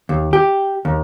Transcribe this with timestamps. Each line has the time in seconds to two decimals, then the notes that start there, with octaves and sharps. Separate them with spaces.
0.09 D#2
0.33 G4
0.85 D#2